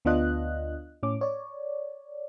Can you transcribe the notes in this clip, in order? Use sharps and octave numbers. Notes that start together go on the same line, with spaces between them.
D2 B3 D4 F4 D#5 F#6
A2 C#4 D6
C#5 D5